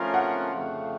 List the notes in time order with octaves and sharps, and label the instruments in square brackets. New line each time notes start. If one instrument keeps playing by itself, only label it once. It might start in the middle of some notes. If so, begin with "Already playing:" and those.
Already playing: [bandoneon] F3 A3 C#4 F4 A#4 [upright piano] F5
[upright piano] F#5
[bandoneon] F2 C#3 A3